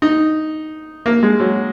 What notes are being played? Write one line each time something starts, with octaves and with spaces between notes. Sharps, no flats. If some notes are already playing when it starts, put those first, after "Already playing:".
D#4
A#3
G#3
F#3